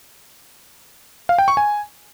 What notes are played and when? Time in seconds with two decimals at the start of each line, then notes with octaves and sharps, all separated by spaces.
1.29 F5
1.38 G5
1.48 C#6
1.57 G#5